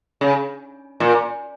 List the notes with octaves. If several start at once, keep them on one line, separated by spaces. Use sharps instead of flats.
C#3
A#2